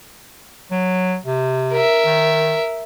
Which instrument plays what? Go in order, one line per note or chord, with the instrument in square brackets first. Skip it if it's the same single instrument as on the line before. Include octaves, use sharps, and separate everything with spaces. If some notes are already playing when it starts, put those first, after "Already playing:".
[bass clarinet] F#3
C3
[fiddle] A#4 E5
[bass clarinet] D#3